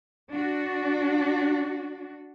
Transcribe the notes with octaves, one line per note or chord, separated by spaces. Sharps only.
D4 F#4